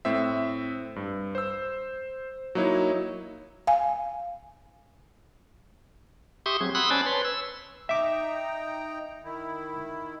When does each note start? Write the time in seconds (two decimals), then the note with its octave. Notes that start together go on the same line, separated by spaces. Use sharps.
0.05 A2 C4 E5
0.96 G2
1.35 C5 E6
2.55 F#3 A#3 D#4 E4 C#5
3.67 F5 G#5
6.46 G4 E5 C6 C#6 D#6
6.61 F#3 C4 G#4
6.75 F#5 B5 C6 D#6 E6 F#6
6.90 C#4 C5 D5 G#5 A5 B5
7.06 B4 C#5 C6
7.25 E6
7.89 D#4 E5 G5 A#5 D6
9.24 D#3 E4